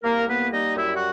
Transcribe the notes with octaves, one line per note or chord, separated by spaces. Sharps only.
C2 A#3 A#4
A#3 B3 B4
G3 D#4 D#5
F#2 E4 E5
F#4 F#5